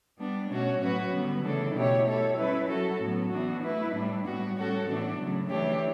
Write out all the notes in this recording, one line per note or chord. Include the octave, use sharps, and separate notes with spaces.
G3 B3 D4
B2 A3 C#4 F#4 C#5
A2 F#3 C#4 F#4 B4
D3 G3 B3
C#3 E3 A3 D4 A4
B2 A3 E4 G4 C#5
A3 E4 A4 C#5
G3 C#4 E4 B4
F#3 C#4 F#4 A4
A2 F#3 B3
E3 B3 D4 F#4
A3 E4 B4
A2 G3 D4
A2 G3 B3 F#4
A2 G3 C#4 F#4 A4
A2 E3 B3 D4
C#3 F#3 A3
E3 A3 D4 G4 C#5